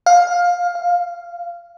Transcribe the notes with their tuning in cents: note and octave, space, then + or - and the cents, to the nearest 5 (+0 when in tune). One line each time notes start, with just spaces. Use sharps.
F5 +15
F5 -15